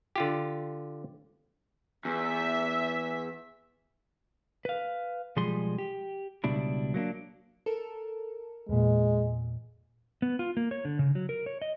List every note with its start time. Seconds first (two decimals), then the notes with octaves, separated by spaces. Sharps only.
0.16 D3 F4 G4
2.05 E2 E5
4.65 B4 F5
5.36 B1 F3 G3 G#3 G#4 C6
5.78 G4
6.44 C#2 B2 G3 D4 E4
6.94 F#3 A#3 C4 D4
7.66 A4 A#4
8.69 E2 A#2 G#3
10.22 B3
10.39 F4
10.57 A#3
10.71 C#5
10.85 D3
10.99 C#3
11.15 F#3
11.29 A#4
11.46 C#5
11.62 D#5